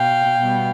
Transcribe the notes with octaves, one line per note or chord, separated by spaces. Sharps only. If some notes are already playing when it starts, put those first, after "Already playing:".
Already playing: B2 F5 G5
B2 G3 B3